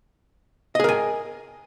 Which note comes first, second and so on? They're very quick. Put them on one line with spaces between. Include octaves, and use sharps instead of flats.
D#5 G#4 A#4 G#5